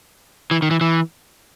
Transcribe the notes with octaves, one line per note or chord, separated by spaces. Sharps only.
E3
D#3
E3
E3